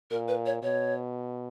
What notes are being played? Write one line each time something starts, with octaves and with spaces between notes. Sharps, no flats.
A#2 A#4
B4
C#5
B2 C#5